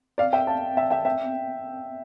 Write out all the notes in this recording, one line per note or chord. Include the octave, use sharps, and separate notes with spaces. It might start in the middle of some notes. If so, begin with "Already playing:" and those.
D5 F5
E5 G5
F5 A5
E5 G5
E5 G5
E5 G5